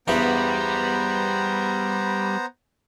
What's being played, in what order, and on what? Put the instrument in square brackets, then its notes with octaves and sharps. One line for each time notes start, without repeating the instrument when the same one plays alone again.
[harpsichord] E2 G2 F#4 [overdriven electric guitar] G3 [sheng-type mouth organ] B3 C5 A#5